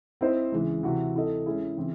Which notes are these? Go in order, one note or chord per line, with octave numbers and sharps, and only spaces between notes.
C4 E4 C5 D#5
C#3 E3 G#3
C3 E3 C4 F#4
C4 E4 A4 D#5
G#3 C#4 E4 G#4
C#3 E3 C4